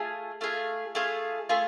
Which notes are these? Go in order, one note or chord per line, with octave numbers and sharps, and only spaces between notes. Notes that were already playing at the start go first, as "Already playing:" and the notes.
Already playing: A3 F4 G#4
A3 F4 G#4
A3 F4 G#4
A3 F4 G#4